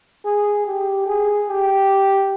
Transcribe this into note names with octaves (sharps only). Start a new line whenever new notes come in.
G#4
G4
G#4
G4